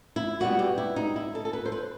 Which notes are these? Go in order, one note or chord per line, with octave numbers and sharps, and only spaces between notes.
E4
B2 G3 B3 F#4
G4
E4
D#4
E4
A4
A4
B4
C5
B4